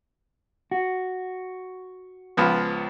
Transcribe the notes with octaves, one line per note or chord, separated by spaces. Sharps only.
F#4
C#2 F3 B3